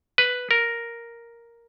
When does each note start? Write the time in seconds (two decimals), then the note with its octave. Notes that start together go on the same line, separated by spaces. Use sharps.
0.18 B4
0.51 A#4